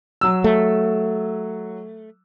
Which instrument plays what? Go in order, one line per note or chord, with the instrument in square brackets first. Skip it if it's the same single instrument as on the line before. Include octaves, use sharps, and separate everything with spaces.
[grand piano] F#3 E6
[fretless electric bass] A3